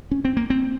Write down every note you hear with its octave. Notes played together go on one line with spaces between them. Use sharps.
C#4
C4
A#3
C4